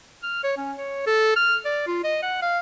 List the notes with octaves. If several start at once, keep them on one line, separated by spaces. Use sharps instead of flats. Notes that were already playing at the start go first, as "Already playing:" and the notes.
F6
C#5
C#4
C#5
A4
F6
D5
F4
D#5
F#5
F5